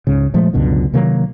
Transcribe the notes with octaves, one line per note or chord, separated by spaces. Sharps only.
C#2 G#2 C#3
A#2 F3 G#3 A3
C#2 F#2 B2 D3
C3 D#3 F#3 A#3